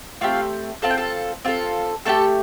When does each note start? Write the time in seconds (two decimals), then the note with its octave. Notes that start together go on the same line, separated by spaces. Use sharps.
0.21 A3 C4 F4 G4 F5
0.82 C4 F4 A4 A5
0.91 G5
0.97 A4 A5
1.45 C4 F4 A4
2.05 A3 D4 G4 A4 A5